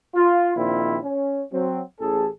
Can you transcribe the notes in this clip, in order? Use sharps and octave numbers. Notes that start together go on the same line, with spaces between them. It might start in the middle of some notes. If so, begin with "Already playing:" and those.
F4
A#1 A#2 D#3 C4 E4 F4
C#4
F#3 C4
A1 G#4 A4